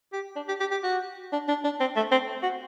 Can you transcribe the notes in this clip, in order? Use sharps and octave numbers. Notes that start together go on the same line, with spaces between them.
G4
D4
G4
G4
G4
F#4
D4
D4
D4
C4
A3
C4
F#4